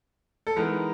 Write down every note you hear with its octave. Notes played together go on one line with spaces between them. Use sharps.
A4
E3 G#3 B3 D#4 A#4